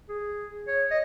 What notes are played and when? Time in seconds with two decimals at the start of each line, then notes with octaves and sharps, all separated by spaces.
0.09 G#4
0.68 C#5
0.91 D#5